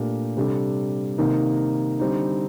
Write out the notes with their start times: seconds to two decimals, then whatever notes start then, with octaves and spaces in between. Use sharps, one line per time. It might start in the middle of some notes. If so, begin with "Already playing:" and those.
Already playing: A#2 A3 D4 G4 A#4
0.37 C3 G3 D4 A4
1.18 C3 D#3 A#3 D#4 A#4
1.99 D3 G3 C4 D#4